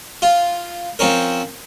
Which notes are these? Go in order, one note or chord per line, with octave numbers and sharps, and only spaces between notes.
F4
F3 C4 C#4 A#4